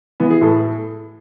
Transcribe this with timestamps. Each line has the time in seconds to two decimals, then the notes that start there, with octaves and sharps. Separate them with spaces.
0.20 E3 B3
0.30 G#4
0.41 A2 A4